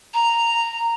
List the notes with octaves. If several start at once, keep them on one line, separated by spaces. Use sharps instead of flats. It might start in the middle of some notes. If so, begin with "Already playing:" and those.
A#5